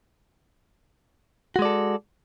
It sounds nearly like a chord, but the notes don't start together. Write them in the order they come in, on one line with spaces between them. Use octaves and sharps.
F#4 G#3 D5 A4